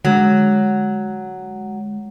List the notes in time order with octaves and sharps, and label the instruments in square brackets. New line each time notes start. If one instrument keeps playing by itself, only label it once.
[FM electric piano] D3 G#3 [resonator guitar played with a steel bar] F#3